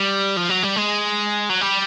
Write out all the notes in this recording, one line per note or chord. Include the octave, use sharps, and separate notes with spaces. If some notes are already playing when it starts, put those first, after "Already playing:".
Already playing: G3
F3
F#3
G3
G#3
F#3
G3